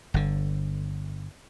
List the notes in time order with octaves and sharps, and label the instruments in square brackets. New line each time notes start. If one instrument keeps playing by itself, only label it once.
[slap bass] G1 D3